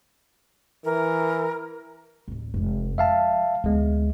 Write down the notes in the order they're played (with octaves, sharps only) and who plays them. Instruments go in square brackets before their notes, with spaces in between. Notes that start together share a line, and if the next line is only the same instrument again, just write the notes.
[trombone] E3 [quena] A#4
[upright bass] D1 A1
F1 G#3
[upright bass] F3 G#3 [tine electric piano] E5 F5 A5
[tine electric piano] D2 G#3 [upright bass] B3 D#4